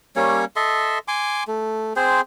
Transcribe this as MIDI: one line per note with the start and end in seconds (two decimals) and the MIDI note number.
0.16 0.45 55
0.16 0.45 58
0.16 0.45 61
0.16 0.45 73
0.56 0.98 69
0.56 0.98 75
0.56 0.98 76
0.56 0.98 84
1.08 1.43 80
1.08 1.43 84
1.08 1.43 86
1.47 1.93 57
1.96 2.21 60
1.96 2.21 68
1.96 2.21 72